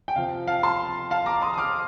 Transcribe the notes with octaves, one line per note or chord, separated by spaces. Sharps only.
G5
C3 F3 C4 F5
F5 A5
A5 C6
F5 A5
A#5 D6
C6 D#6
D#6
D6 F6